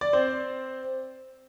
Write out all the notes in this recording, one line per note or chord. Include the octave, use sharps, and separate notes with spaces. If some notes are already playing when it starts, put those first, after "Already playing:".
D5
C4 C5